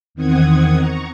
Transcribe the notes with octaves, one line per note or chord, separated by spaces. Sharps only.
E2 D#3 C4 F#5 D#6 G#6
A#5 C#6